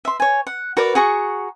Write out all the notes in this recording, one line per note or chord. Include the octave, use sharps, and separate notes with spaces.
E5 C6
C#5 G#5
F#5
F#4 A#4 B4 D5
F#4 G#4 A#5 C#6